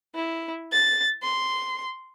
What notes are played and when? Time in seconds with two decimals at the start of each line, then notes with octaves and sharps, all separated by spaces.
0.15 E4
0.72 A6
1.23 C6